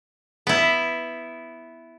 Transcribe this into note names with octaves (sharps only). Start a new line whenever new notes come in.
B3 E4